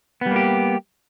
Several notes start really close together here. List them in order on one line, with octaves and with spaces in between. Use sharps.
B3 G3 A#3 G4